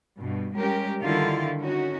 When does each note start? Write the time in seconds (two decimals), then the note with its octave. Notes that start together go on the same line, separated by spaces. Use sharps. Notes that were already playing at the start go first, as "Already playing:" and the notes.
0.19 G2 B2
0.55 G3 G#3 C#4 G4 A#4
1.00 D3 D#3 G3 E4 F4
1.60 C#4 D#4 F#4